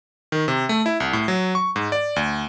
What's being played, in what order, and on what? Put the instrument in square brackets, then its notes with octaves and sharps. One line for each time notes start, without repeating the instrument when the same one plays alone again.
[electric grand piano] D#3
C3
A3
E4
C2
A2
F#3
C#6
G#2
D5
D2